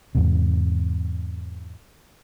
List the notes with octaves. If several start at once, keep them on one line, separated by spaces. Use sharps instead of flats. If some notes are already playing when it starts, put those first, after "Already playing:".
E2 G#2 C3